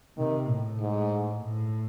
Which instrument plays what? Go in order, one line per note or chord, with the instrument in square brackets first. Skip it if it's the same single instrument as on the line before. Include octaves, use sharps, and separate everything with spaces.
[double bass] C3 [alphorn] D#3
[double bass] A2
[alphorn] G#2
[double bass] A2